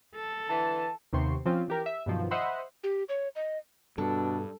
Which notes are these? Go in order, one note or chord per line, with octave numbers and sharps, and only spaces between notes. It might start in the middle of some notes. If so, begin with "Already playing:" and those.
A4
D3 E3 A5
D#2 C3 B3 C4 C6 C#6
F3 C4 C#4 F4
E3 G4 A#4
E5
G2 B2 D#3 F3 F#3
C5 D#5 E5 F#5 B5 C6
G4
C#5
D#5
G2 B2 D4 A4